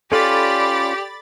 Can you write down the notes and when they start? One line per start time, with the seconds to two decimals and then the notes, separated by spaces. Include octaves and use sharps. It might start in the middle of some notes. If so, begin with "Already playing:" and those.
0.12 C#4 F4 G4 A4 D5 B5 A6